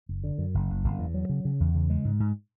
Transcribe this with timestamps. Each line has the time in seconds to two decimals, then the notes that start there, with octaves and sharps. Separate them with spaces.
0.09 F#1
0.24 D3
0.38 F#2
0.54 F#1
0.70 F#1
0.84 F#1
0.99 E2
1.14 F#3
1.29 C#3
1.45 C#3
1.60 E2
1.75 C#3
1.90 G#3
2.05 G#2
2.20 G#2